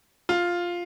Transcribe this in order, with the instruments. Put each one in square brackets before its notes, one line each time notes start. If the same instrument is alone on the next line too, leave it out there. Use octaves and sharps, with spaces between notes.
[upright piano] F4